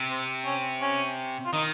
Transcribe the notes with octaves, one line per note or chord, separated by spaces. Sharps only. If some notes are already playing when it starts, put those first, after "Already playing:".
Already playing: C3
C4
C#4
C#4
F4
D#3 D#4